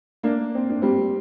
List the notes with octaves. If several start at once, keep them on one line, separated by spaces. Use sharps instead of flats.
A#3 D4
C4
D4
G3 C4